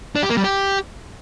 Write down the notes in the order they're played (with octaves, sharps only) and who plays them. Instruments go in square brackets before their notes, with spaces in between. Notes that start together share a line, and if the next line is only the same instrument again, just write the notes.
[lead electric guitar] D4
G4
A#3
G3
G4